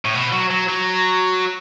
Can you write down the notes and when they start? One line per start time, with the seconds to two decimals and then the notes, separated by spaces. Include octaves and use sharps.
0.05 A2
0.14 B2
0.32 F#3
0.51 F#3
0.69 F#3